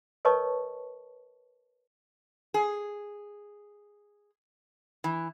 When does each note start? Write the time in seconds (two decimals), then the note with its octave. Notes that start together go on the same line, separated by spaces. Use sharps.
0.25 A#4 B4 C#5 D#5 A5 C#6
2.54 G#4
5.04 E3